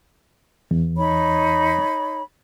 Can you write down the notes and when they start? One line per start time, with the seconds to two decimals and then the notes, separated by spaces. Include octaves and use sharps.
0.71 E2
0.97 D#4 C#5 B5